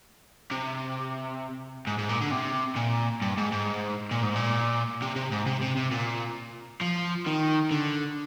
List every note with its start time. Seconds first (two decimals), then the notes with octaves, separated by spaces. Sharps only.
0.52 C3
1.87 G#2
1.98 G#2
2.09 A#2
2.21 D3
2.31 C3
2.76 A#2
3.22 G2
3.37 G#2
3.52 G#2
4.11 A#2
4.23 G#2
4.36 A#2
5.02 C3
5.16 C3
5.31 G#2
5.46 C3
5.61 C3
5.77 C3
5.91 A#2
6.81 F3
7.26 D#3
7.71 D3